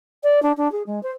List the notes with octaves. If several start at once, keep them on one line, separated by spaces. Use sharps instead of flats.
D5
D4
D4
G#4
G#3
C5